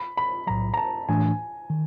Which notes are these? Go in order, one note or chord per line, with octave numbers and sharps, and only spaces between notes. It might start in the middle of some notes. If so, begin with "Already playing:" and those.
Already playing: B5
B5
B1 A2 F#3 A#5
A#5
A5
A2 E3 A3 D4 G#5
D#3